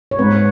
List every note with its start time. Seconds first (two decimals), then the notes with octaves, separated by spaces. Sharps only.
0.11 C#5
0.19 G#2 B4